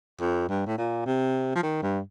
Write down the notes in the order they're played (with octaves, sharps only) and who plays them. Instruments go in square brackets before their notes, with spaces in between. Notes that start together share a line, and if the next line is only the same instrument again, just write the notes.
[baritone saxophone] F2
G2
A2
A#2
C3
F3
D#3
G2